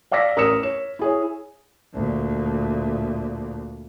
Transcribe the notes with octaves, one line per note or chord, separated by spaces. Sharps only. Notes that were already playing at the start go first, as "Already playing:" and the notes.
D5 F5 D6 E6 A#6 B6
A1 A#4 D#6 E6 C#7 E7
C#5 E7
E4 G#4 C#5
D2 A#2